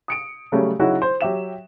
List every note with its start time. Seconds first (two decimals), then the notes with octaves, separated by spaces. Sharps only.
0.08 D#6 C#7 D7
0.52 C#3 F#3 G3 A3 C#4
0.79 C#3 F#3 D#4 E4 F#4
1.02 C5
1.21 F#3 G4 E5 E7